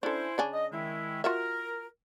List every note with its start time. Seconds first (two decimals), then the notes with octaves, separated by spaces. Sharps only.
0.03 C#4 D4 E4 A4 C5
0.38 C#3 D4 G#5
0.53 D#5
0.72 D#3 G#3 E4
1.24 F4 F#4 A#4 E5